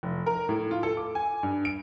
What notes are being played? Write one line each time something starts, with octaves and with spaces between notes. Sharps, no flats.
F1
A#4
A2
F4
A4
D6
G#5
G2
D7